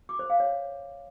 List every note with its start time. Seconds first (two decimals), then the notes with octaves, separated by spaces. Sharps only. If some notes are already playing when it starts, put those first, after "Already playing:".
0.09 D6
0.19 C5
0.30 F5
0.40 C#5